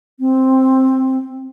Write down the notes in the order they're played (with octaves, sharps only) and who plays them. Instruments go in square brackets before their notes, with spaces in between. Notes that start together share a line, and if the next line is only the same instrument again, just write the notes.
[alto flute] C4